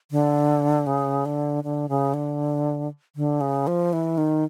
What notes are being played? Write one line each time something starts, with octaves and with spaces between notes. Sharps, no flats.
D3
C#3
D3
D3
C#3
D3
D3
C#3
F3
E3
D#3